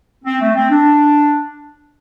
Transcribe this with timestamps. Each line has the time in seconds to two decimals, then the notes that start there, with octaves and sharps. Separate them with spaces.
0.24 C4
0.40 A3
0.55 C4
0.70 D4